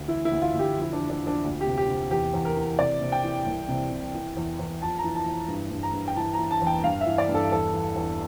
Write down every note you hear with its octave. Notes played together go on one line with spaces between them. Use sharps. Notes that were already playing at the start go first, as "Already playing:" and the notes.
Already playing: D2
E3 E4
E4
D2
F4
D2
G4
F2
E4
D4
E3
D4
F2
D4
D2
G4
C3
G4
C3
E2 G4
E2
A#4
E3
C3 D5
C3
G5
E3
C2
C3
C3
E3
E2
E2
F2 A5
A#5
E3
A5
E3
G2
G2
A#5
G2
G5
E3 A5
A#5
E3
A5
E2
G5
G2 F5
E5
E3
D5
G2
A4
E2 A4
E3
E2